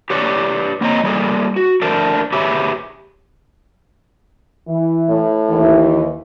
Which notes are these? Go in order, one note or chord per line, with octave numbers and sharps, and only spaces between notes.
G4 B4 C#5 D5
A#3 C4 C#5 D#5 A#5
G3 A#3 G#4 A4
F#4
A3 D4 A#4 C5
G4 G#4 B4 C#5 E5
E3
A2
D#2 E3